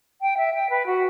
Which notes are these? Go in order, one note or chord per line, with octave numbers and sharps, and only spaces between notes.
G5
E5
G5
B4
F#4